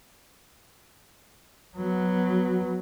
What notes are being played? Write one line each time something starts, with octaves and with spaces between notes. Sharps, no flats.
F#3 B3